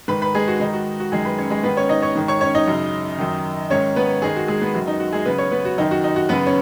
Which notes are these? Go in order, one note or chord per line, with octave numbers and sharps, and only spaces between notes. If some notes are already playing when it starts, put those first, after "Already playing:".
G#2 D#3 B4 B5
B4 B5
G#3 G#4
F#4
G#2 D#3 D#4
F#4
F#4
F#2 D#3 G#3 G#4
B4 B5
C#4 C#5
G#3 G#4
G#2 D#3 B3 B4
C#4 C#5
D#4 D#5
C#5 C#6
G#2 D#3
C#5 C#6
C#4 C#5
D#4 D#5
F#2 C#3
F#2 D#3
G#2 D#3 C#4 C#5
B3 B4
G#2 D#3 G#3 G#4
F#4
G#3 G#4
B3 B4
F#2 D#3 F#4
D#4
F#4
G#3 G#4
F#2 C#3 B3 B4
C#4 C#5
B3 B4
F#4
F#2 D#3 D#4
F#4
D#4
F#4
F#2 C#3 B3 B4
C#4